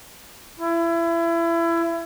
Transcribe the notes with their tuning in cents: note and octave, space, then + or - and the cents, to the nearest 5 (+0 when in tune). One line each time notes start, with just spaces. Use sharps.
E4 +30